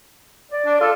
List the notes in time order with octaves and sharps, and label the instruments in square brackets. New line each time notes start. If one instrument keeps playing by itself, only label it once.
[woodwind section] D5
[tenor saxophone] D4
[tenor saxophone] F4 [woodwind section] A4